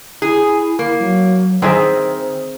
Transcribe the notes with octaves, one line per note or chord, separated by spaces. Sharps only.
E4 G#4
A#3
F#3
D#3 C4 G#4 C5 E5